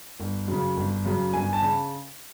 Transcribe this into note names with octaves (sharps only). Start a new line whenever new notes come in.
G1
F#2 C#3
G1
F#2 C#3
G1 G#5
A5
C#3